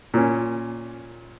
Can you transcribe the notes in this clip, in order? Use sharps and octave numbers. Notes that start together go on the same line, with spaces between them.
A#2 C#4